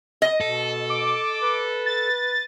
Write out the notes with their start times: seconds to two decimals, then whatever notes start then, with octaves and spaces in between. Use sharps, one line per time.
0.22 D#5
0.41 B2 A4
0.90 D6
1.42 B4
1.86 A6